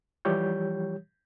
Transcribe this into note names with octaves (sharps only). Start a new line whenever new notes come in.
E3 F3 G3 G4 C#5 G6